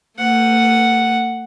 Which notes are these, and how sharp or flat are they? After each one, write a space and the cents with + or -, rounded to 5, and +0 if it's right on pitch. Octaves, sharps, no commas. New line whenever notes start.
A3 +45 F#5 +0